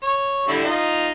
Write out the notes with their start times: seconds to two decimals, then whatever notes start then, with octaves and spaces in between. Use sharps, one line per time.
0.02 C#5
0.48 D3 G3 E4
0.65 D#4 F4